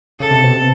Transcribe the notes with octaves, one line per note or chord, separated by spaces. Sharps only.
C#3 A4
C3
B2
C3